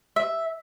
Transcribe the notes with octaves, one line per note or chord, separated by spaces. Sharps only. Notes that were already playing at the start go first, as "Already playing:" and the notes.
E5